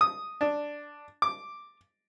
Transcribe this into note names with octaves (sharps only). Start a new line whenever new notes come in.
D#6
D4
D6